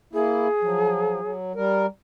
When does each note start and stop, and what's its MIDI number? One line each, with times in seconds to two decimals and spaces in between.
0.13 0.48 58
0.13 0.48 64
0.13 1.31 68
0.62 1.20 53
0.62 1.20 54
1.21 1.52 54
1.55 1.86 55
1.55 1.86 70